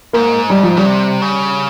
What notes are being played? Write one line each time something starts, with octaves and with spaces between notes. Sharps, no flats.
G#2 A#3
G3
F3
C#3 G3
C3
C#3